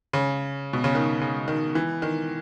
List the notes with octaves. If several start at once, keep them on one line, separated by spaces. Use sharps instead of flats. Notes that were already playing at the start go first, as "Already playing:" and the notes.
C#3
B2
C#3
D#3
C#3
D#3
E3
D#3